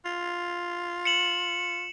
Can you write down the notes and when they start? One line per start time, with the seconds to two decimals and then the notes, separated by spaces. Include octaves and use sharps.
0.05 F4
1.05 C#7 E7 F#7